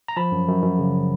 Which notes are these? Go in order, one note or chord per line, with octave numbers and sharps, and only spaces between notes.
A#5
F3 A5 B5
F#2
F#2
F#2
C#3